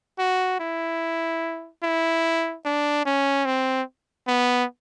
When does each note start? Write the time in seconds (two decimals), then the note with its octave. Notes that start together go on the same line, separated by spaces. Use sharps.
0.19 F#4
0.60 E4
1.83 E4
2.65 D4
3.06 C#4
3.45 C4
4.28 B3